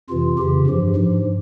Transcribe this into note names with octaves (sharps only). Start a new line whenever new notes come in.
F2 C3 E3 F4
F2 C#3 E3 G4
G2 F3
G#2 F3